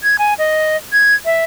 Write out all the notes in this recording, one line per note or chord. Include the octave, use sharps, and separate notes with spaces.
G#6
G#5
D#5
G#6
E5